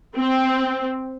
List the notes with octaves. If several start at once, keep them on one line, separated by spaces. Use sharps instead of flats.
C4